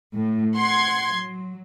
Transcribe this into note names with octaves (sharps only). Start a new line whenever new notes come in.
A2
F#5 C6 G#6
F#3